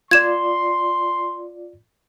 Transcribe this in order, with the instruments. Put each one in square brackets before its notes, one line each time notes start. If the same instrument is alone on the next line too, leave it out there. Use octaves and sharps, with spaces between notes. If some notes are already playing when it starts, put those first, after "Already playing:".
[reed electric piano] F4 D5 [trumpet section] C6 [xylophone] G#6 E7